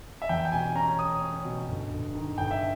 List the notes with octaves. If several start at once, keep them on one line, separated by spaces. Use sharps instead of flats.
E5
E2 G5
G5
B2 G#5
C#4 A#5
C#4 D#6
C#4
B2
G1
G1
D#3
G1 G5
E5